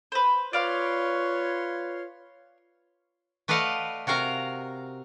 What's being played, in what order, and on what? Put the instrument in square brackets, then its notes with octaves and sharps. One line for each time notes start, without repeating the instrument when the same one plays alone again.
[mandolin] B4 C5
[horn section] F4 B4 C#5 [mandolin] D5 F5 C6
[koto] A3 B4 D5 D#5 F5 F#5
C3 F#4 A#4 F5 A#5